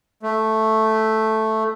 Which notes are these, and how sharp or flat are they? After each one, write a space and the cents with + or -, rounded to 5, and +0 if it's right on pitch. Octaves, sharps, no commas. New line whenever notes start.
A3 +0